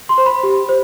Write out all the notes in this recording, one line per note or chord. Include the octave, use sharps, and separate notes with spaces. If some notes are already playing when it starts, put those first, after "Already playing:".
C6
C5
B5
G4
C5